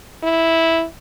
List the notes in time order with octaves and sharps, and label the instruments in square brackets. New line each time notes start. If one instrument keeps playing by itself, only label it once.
[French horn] E4